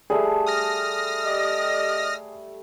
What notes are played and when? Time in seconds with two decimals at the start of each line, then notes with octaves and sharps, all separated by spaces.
0.10 G3 A3 G#4 E5
0.47 D#6 F6 A#6
1.24 G4 D5 D#5